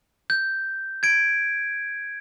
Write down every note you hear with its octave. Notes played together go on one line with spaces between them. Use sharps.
G6
G#6 D7